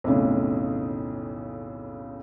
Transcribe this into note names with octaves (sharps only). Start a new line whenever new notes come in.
B1 F2 A2 C#3